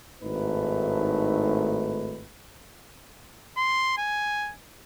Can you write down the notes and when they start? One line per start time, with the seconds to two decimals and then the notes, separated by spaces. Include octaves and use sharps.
0.22 G#1 A2 A3 D#4 B4
3.57 C6
3.98 G#5